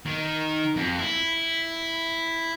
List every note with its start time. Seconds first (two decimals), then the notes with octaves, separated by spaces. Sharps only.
0.06 D#3
0.76 F2
0.99 E4